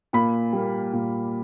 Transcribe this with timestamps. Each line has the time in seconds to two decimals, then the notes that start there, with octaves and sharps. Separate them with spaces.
0.13 A#2 B5
0.53 G3 A#3
0.93 A#2